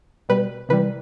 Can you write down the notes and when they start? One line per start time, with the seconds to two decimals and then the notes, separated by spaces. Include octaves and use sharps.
0.29 B2 G3 B4
0.69 C3 E3 G3 B4